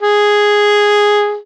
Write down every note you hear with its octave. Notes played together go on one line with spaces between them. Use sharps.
G#4